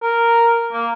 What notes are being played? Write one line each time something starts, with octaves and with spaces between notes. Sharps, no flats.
A#4
A#3